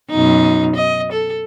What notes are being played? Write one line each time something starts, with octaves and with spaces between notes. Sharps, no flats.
F#2 B2 D#4
D#5
A4